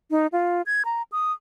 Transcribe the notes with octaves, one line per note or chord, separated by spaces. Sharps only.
D#4
F4
G#6
A#5
D#6